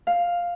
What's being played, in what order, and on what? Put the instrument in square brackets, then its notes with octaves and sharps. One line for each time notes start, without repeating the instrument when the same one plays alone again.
[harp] F5